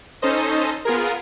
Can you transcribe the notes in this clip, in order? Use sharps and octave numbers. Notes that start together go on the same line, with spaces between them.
C#4 D#4 A4 C5 D#5
B3 F4 G#4 A#4